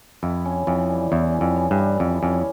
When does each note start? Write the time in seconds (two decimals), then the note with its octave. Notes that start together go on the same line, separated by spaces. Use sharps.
0.23 F2 E4
0.45 C#4
0.67 F2 E3
0.90 G3
1.12 E2 E4
1.34 C#4
1.41 F2
1.56 E3
1.71 G2
1.78 G3
2.00 F2 E4
2.22 F2 C#4